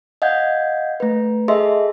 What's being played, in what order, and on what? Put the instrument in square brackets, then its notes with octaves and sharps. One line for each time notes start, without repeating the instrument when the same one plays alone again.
[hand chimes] D#5 F5 F#5 G6 G#6
A3 B4
G#4 A4 D#5 E5 C6